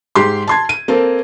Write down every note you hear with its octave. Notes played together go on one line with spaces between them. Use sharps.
G#2 G4 C6
A5 C6 G#6
D#7
A#3 C4 A4